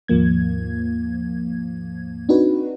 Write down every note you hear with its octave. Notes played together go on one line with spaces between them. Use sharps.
D#2 G#2 F3 A#3 G#6
C4 D4 D#4 F#4 B4